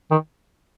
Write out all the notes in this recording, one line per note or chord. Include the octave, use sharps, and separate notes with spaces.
D#3